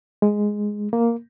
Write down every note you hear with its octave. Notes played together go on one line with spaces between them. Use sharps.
G#3
A#3